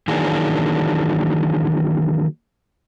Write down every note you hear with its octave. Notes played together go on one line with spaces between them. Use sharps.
D#3 E3 F#3 A#3 D4 G#4